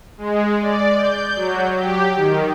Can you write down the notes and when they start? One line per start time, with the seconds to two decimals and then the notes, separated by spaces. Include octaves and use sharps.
0.18 G#3
0.60 D5
0.98 G6
1.36 F#3
1.77 G4
2.16 D#3